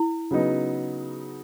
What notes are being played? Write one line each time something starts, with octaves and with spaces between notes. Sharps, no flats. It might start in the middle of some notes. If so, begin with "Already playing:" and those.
Already playing: E4
C#3 F#3 B3 D#4